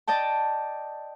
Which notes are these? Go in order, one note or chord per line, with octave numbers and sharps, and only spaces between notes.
D5 D#5 G5 A5